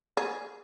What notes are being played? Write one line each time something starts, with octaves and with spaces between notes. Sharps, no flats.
G#4